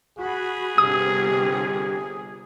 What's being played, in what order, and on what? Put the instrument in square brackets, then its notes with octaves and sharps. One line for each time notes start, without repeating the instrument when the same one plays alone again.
[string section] F#4 B5 [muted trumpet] G#4
[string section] G1 C3 [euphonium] G4 [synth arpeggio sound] D#6